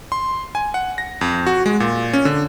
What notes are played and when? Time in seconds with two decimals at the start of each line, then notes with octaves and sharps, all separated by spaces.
0.12 C6
0.55 G#5
0.74 F#5
0.98 A#6
1.21 F2
1.47 F#4
1.66 G#3
1.80 A#2
2.13 C#4
2.25 D3